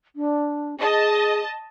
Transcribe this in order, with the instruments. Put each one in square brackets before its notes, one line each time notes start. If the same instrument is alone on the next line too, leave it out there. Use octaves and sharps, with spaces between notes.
[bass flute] D4
[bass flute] G#4 [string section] D#5 A5